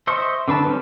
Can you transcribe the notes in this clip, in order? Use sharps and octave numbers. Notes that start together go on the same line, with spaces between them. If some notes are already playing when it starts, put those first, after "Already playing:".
C5 D#5 E5 C6 C#6
D3 D4 B4 A5
G3 C4 C#4 G4